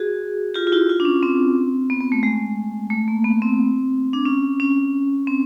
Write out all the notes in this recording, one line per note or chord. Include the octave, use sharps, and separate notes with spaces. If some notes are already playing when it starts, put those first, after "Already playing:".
Already playing: F#4 G#4
F4 G4
F4
E4 F#4
F4
D4
C#4
C4
B3
B3
A3
G#3
A3
A#3
B3
C4
D4
C#4
C#4
C4